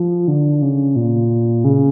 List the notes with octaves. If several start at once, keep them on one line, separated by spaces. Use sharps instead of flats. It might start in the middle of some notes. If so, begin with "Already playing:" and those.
Already playing: F3
D3
C#3
A#2
C#3